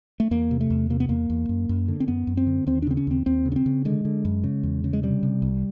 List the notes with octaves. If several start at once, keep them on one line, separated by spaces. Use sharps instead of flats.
A3
E2 A#3
C3
A3
E2
C3 A#3
B3
E2 A#3
E2
F#2
F#2
D3
C4
F#2 B3
F#2
C4
D3
D#2 C4
D4
C#3 C4
C#4
D#2 C4
D#2 C4
C#3
C#4
C4
C#3
D3 G#3
D3
F#2
C#3
E2
C#3
G#3
C3 G3
C3
C2